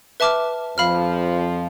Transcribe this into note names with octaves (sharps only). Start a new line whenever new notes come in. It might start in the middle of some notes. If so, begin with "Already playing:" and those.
B4 E5 A5 D6 F6
F2 F3 F5 B5 F6